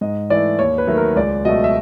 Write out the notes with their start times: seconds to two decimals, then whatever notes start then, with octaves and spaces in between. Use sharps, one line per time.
0.01 G#2 D#5
0.30 E3 A3 D5
0.59 D#2 C#5
0.78 B4
0.87 D#3 F#3 A3
0.97 A#4
1.16 C#2 D5
1.45 B2 F#3 A3 D#5
1.64 E5